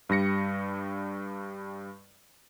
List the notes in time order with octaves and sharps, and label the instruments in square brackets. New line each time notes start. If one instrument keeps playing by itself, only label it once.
[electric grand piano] G2 G3 A#6 C#7